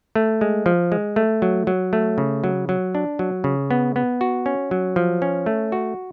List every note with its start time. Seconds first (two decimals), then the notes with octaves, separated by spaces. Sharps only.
0.15 A3
0.41 G#3
0.66 F3
0.92 G#3
1.16 A3
1.42 F#3
1.67 F#3
1.93 A3
2.18 C#3
2.44 F#3
2.69 F#3
2.95 D4
3.19 F#3
3.44 C#3
3.71 B3
3.96 B3
4.21 F#4
4.46 C#4
4.71 F#3
4.96 F3
5.22 C#4
5.46 A3
5.72 F#4